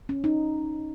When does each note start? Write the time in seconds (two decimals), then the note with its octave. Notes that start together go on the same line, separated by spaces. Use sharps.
0.09 C#4
0.24 D#4